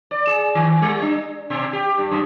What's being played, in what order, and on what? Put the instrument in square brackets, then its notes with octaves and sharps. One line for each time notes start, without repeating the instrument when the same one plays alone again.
[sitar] D5
G#4
D#3
G3
D4
B2
G4
G2
F#2